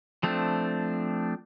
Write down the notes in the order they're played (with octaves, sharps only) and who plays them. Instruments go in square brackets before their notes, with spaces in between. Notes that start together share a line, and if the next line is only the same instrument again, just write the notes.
[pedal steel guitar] F3 A3 C4 D4